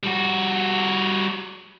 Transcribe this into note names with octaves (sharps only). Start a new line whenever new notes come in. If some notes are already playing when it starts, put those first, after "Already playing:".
G3 F#4